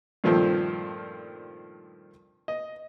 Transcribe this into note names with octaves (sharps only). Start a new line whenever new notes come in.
G2 A#2 D#3 F3 A3 C4
D#5